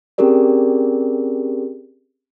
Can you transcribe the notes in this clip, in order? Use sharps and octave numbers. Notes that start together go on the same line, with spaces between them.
C4 C#4 G4 G#4 A#4 D5